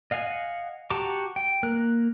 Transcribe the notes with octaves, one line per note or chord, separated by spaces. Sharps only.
D#5 F5 F#5 G#5
F#4 G4 A5 A#5 D6
G5
A#3 A#4 F#6